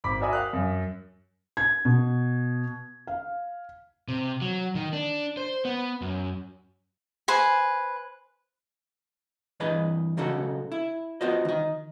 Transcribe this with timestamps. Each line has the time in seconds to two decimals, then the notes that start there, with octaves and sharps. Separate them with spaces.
0.04 G#1 B5 D6 B6
0.20 F#4 A#4 D5 E5 G#5 D#6
0.33 F5 G5 F#6
0.53 F#2
1.57 G#6
1.85 B2
3.07 F5
4.08 C3
4.41 F#3
4.75 D#3
4.93 D4
5.37 C5
5.65 B3
6.02 F#2
7.28 B4 C5 G#5
9.60 G2 E3 G#4 B4 D#5 B5
10.17 B1 C#3 D#4 F#4 A4
10.72 E4
11.21 B3 F4 F#4 C5 D#5
11.45 D#3 D#5